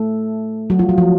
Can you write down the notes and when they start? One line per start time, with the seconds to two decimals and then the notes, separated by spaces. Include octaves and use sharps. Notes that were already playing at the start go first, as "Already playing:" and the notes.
Already playing: A3 A4
0.70 F#3 F#4
0.79 F3 F4
0.89 F#3
0.98 F3